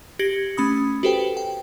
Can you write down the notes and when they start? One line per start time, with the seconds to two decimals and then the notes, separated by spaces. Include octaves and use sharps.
0.19 G4 G#6 A#6 C#7 F#7
0.57 A3 C#4 B5 D#6
1.03 F#4 G4 A4 B4 C5 G5
1.37 G5